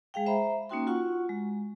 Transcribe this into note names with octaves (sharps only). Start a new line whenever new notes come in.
G#3 G#4 F5 G5
C5 E5 A#5 B5
A#3 C#4 D#4 F#4 G5 C6
F4 F#4 F#5 C#6
G#3